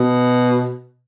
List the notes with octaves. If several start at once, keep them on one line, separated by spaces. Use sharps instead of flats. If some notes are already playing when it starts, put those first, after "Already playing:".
Already playing: B2